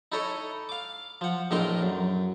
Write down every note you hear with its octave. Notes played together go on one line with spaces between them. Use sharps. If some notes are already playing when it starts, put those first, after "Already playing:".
D#4 E4 A4 C#5 D#5
F5 D6
F3 F#5
A#1 A2 E3 D#4 A#4 C6
F#2